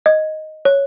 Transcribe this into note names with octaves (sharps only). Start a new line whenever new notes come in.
D#5
C#5